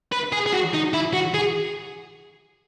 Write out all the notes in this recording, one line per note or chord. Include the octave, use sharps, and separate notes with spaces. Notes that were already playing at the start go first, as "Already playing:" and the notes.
B4
G#4
G#4
F#4
D#4
E4
F#4
G#4